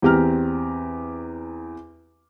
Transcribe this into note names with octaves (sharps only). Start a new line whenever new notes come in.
E2 C4 G4 A#5 F6